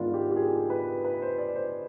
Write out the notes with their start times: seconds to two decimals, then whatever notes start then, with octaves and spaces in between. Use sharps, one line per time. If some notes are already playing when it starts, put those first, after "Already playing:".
Already playing: G#2 D#3 B3 D4 F4
0.14 G4
0.31 G4
0.36 G#4
0.70 B4
1.05 B4
1.22 C5
1.38 D5
1.56 C5